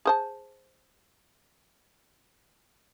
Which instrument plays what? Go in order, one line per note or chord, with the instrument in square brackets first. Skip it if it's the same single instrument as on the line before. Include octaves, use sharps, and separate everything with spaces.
[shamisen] G#4 C5 A5